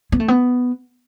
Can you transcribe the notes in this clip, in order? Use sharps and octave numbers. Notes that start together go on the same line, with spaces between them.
B3
A3
B3